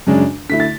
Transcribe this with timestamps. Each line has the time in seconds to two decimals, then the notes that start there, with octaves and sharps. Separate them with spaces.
0.07 F#2 C#3 G#3 D4
0.49 D3 A3 E4 B6
0.60 A6